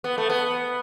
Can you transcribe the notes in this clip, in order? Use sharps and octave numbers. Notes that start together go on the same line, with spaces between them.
B3
A3
B3